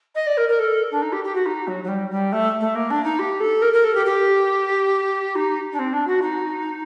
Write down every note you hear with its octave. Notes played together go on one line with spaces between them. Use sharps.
D#5
D5
A#4
A#4
A4
D4
D#4
G4
G4
F#4
D#4
F#3
F#3
G3
G3
A3
A3
A#3
D4
D#4
G4
A4
A#4
A#4
A4
G4
G4
D#4
D4
C4
D4
F#4
D#4